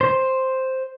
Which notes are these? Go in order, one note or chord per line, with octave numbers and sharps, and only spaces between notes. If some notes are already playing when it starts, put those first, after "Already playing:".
C5